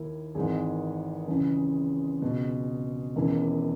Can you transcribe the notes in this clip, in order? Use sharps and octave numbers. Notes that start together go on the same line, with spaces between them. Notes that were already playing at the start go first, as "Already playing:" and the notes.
Already playing: D#2 D#3 E4
G#1 G#2 E3 G#4
C#2 C#3 E3
C#2 B2
E1 D#2 C#3 E3